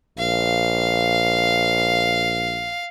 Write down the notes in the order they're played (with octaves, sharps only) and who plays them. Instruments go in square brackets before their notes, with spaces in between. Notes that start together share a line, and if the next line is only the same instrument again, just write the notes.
[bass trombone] A#1 [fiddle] F5